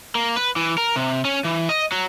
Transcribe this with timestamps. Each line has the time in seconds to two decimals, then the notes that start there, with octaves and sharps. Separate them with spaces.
0.15 A#3
0.36 B4
0.56 E3
0.78 A#4
0.96 C3
1.25 C#4
1.44 E3
1.69 D#5
1.92 F#3